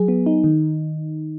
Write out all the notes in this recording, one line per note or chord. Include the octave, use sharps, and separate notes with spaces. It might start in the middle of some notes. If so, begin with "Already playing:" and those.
Already playing: F#3 G#4
B3
D#4
D#3